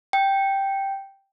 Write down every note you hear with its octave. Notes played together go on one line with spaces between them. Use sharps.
G5